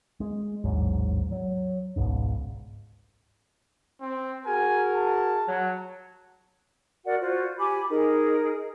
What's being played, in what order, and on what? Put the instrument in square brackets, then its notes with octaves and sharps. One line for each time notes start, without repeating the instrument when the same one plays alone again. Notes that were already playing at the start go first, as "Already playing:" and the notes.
[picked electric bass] G#3
A1 D#2 G#2 F#3
F#3
G#1 C#2 G#2 B2
[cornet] C4
[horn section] F#4 G#4 A#4 [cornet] G#5
[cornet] A5
[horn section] F#3
[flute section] F#4 A#4 D5 F#5
F4 F#4 C5
G4 G#5 B5 D6
D#4 G#4 A#4